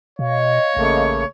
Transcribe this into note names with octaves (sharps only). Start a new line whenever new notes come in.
B2 C#5 D#5 F5
A1 C#3 A3 A#3